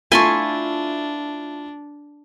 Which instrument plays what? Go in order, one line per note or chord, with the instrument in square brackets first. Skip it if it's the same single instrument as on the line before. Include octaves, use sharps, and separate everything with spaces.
[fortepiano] A3 F4 [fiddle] D4 [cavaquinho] E4 A5 C#6 [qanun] G#5 C6